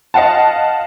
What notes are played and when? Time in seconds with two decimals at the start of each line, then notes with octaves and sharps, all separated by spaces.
0.14 D#5 F5 F#5 A5